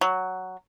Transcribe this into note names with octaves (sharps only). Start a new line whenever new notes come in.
F#3